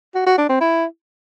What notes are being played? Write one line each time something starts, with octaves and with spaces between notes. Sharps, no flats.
F#4
F#4
D4
C4
E4